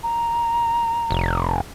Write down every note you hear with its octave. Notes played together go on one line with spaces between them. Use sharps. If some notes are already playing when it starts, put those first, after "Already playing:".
A#5
F1